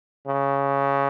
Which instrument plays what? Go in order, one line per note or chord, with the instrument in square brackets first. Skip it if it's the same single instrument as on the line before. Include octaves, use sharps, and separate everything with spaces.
[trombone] C#3